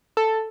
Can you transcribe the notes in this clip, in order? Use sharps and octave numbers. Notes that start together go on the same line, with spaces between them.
A4